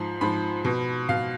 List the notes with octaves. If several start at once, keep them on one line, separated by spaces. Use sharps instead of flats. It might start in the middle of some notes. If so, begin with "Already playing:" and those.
Already playing: G#2 F3 C6
G#2 F3 B5
B2
B2 F5